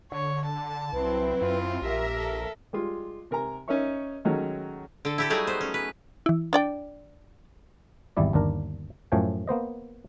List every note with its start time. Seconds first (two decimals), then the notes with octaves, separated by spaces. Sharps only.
0.12 D3 C#5
0.45 A5
0.93 C2 F#3 C4 E4 B4
1.41 F#2 F4
1.82 A#1 G4 A#4 E5
2.16 A4
2.73 G3 G#3 F4
3.31 C3 A#4 G#5 A#5
3.68 C#4 D#4 A#4 C#5 E5 C#6
4.25 D#3 F#3 G#3 A3 C#4
5.05 D3 A4
5.18 E4 G4 A4
5.30 F#3 G3 A3 D#4 G#4
5.47 B3 C5
5.61 C#4
5.74 B4
6.26 E3 E4
6.53 D4 D5 G5
8.17 G#1 E2 G3 E4 D5
8.33 G1 D#2 D4 A#4
9.12 F#2 A2 F3 A3 G5 G#5
9.48 A#3 B3 C5 D#5